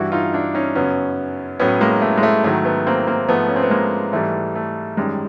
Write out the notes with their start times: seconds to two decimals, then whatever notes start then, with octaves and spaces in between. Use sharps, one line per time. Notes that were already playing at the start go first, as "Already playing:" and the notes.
Already playing: G2 E3 G3 E4 F#4
0.12 D#4 F4
0.33 D4 E4
0.54 C#4 D#4
0.75 F#2 C#3 F#3 B3 C#4
1.59 A2 F#3 B3 C#4
1.81 G#3 A#3
2.02 A3
2.17 G#3
2.23 A3
2.44 G#2 D#3 F#3 A3
2.65 A3 B3
2.86 A#3 C4
3.07 A#3 C4
3.28 G#2 F3 A3 B3
3.48 C#4
3.56 C4
3.63 B3
3.70 G#3 A#3
4.13 G#2 E3 G3 A3
4.55 A3
4.97 F#2 D#3 G3 G#3